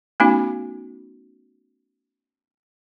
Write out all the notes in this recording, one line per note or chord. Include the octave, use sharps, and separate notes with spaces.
A3 B3 C#4 D#4 F#4